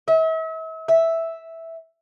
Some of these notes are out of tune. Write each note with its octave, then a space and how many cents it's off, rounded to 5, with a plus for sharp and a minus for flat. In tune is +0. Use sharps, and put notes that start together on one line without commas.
E5 -40
E5 -5